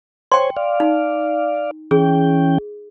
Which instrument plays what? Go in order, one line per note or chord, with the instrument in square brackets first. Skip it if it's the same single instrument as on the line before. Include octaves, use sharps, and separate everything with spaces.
[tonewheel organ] C5 C#5 G#5 [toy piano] G5 C6
[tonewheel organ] D5 F5
[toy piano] D#4
[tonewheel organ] E3 C#4 G5 [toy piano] G#4